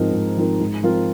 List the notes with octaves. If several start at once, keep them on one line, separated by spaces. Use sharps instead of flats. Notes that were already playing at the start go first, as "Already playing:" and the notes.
Already playing: G#2 F3 C4 D#4 A#4
G#2
F3 C4 D#4 A#4
G#2
F3 C4 F4 A#4